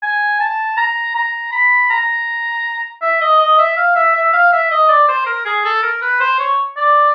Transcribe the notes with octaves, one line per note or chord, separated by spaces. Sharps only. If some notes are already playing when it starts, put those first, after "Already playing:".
G#5
A5
A#5
A#5
B5
A#5
E5
D#5
D#5
E5
F5
E5
E5
F5
E5
D#5
D5
C5
A#4
G#4
A4
A#4
B4
C5
C#5
D5